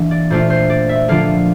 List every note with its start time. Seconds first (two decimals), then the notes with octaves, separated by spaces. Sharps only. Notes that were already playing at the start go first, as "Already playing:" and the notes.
Already playing: E3 A#3 D4 E5
0.11 D5
0.30 A#2 A3 D4 F4 C5
0.50 C5
0.70 D5
0.89 E5
1.08 D3 F3 A#3 D4 F4 F5